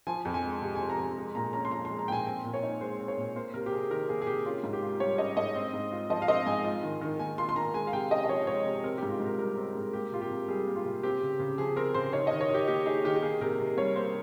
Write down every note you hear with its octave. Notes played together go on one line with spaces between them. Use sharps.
F3 G#5
F2
G#5
G#3
C3
F3 G#5
A#5
F2 G#5
G#3
A#2 A#5
C#4 A#5
C6
F3 A#5
G#3 C6
A#5
A#2 G5 G#5
C4 G#5
A#2
C#5
D#4
G#3 C5
C4
C#5
A#2
A#3 C5
C3 A#4
G4
C3 G#4
D#3 A#4
A#3 G#4
G#4
C3 G4
C#4 F4
G#2
G4
F4
G3 C#5
C#4 D#5
G#2 D#5
C4
G#2
F4
F3 D#5
F5
C4 D#5
G#2 G#5
F4
D#3
D#3
A#3 G#5
F4 C6
C6
D#3 A#5
G#3 G#5
F5
C3 G5
C#4 D#5
D#5
F3 C#5
G#3 C#5
C3
C4 A#4
G#2 G4
F4
G#2
A#4
G3 A#4
C4
G#2
A#3 G4
C3 F4
G4
C3
G3 G#4
A#3
F4
C3
C4 G4
C#3
C#3
F3 G#4
C4 A#4
C#3 C5
D#4 C#5
D#3 D#5
C#5
D#3 G4
A#3 G4
D#4 G#4
D#3 G4
G4
A#3 G#4
C3 A#4
C3
G3 C#5
A#3 C5